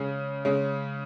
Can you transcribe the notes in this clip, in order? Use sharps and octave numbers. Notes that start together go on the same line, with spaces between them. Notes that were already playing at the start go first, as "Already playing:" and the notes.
Already playing: C#3 G#3 C#4
C#3 G#3 C#4